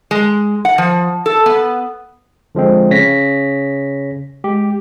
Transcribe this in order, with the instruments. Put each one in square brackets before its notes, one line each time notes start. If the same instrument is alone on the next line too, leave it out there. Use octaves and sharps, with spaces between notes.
[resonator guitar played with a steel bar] G#3
F#5
F3
A4
B3
[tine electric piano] D3 F3 G#3 C4
C#3 C#5 A#6 B6
G#3 G4